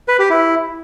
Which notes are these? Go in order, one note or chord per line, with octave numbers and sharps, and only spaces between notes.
B4
G4
E4